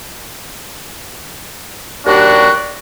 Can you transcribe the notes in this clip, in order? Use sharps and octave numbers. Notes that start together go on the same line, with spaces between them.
D#2 G3 D4 F#4